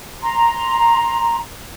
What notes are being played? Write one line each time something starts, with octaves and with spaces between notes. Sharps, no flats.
A#5 C6